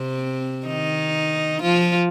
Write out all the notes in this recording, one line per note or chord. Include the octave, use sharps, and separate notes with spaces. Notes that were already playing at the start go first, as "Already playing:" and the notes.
Already playing: C3 C4
D#3 D#4
F3 F4